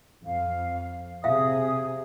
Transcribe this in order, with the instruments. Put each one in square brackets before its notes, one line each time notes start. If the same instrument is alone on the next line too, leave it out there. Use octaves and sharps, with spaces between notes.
[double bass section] F2 [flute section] F5
[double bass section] C3 [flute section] G#4 D#6 [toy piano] E5 F5